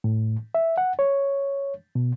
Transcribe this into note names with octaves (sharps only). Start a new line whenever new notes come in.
A2
E5
F#5
C#5
B2